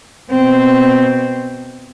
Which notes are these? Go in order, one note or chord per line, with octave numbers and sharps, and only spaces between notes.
B2 C4